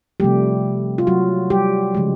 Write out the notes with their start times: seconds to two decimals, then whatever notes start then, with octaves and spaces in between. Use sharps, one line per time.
0.20 C3 F3 G3 A3 G4
0.98 F4
1.07 F#3 F#4
1.50 G3 G4
1.95 C#3 F3 G#3